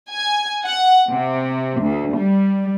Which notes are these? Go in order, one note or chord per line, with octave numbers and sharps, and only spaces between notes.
G#5
F#5
C3
D2
G3